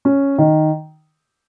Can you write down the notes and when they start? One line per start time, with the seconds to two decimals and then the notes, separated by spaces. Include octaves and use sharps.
0.05 C#4
0.38 D#3